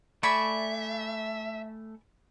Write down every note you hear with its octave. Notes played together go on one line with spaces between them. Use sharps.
A3 D5 E5 G#5 B5 C#6